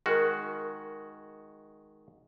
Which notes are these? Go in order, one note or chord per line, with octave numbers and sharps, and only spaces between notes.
D#3 G#3 F#4 G#4 A#4